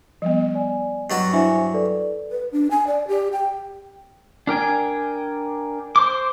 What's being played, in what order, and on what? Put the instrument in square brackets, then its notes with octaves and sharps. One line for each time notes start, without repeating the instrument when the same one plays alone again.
[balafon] F3 G3 B3 [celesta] D#5
[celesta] D5 G#5
[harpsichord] G2 F#3 F#4 [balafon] D#5 [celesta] A6
[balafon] D4 E4 C5 [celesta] E5 G#5
[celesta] A4 B4 D5
[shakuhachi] B4
D4
G#5
D5
G4
G5
[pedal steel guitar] D4 A#4 G5 G#5
C5 C6 D6